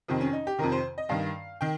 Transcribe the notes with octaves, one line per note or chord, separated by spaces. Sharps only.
F2 C3 D#3 C4
C#4
D#4
G4
F2 C3 D#3 A#4
C5
D#5
G2 D#3 F5
D#3 G5